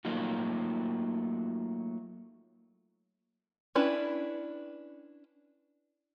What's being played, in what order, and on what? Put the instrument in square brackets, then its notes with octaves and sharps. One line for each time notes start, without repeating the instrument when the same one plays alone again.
[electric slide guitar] F#3 A3 A#3 D#4 F4 F#4
[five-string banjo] C#4 D4 E4 B4